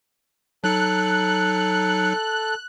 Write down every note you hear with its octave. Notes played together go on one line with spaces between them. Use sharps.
F#3 D#4 A4 F#6 C#7